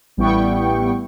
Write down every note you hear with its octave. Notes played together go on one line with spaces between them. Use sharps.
A1 G3 B3 E4 G5 C#6